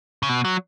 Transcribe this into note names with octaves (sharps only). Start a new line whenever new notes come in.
C#3
B2
F#3